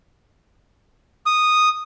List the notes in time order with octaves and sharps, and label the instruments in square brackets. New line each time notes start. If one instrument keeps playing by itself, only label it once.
[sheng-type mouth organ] D#6